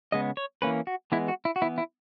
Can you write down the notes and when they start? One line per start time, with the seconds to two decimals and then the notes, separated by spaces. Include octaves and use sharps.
0.12 C#3 G#3 B3 D#5
0.37 C#5
0.62 E3 A#3 C#4 B4
0.87 F#4
1.12 E3 G#3 B3 E4
1.28 F#4
1.45 E4
1.56 F#4
1.62 E3 B3 E4
1.78 E4